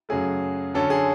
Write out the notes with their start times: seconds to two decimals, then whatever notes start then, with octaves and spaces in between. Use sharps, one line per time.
0.09 F#2 C#3 F#3 A3 G#4
0.74 F#2 D3 F#3 C#4 A4
0.90 G#4